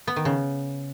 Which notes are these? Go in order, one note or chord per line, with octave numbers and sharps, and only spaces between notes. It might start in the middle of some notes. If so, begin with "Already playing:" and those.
B3
D#3
C#3